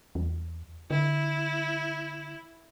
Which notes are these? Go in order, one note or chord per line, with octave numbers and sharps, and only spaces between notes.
E2
D3 E4